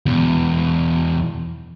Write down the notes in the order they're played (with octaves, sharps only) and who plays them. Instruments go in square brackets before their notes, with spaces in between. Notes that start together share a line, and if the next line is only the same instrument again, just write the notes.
[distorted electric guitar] E2 B2